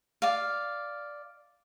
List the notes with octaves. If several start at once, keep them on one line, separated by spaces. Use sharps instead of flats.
D5 F5